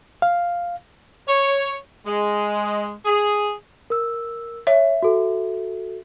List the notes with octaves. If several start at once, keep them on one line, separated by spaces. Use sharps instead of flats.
F5
C#5
G#3
G#4
A#4 E6
C#5 E5
F#4 A4